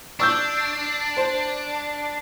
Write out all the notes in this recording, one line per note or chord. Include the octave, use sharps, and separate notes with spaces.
D4 C#6 E6 G6
C5